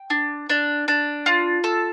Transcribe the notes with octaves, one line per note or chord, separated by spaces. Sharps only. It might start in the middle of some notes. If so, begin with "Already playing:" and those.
Already playing: G5
D4
D4
D4
F4
A4